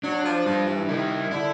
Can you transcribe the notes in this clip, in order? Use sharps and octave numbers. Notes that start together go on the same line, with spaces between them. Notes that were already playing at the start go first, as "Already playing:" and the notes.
F#3 D4
F3
F3 G3
E3
D#3 E4
D3 E4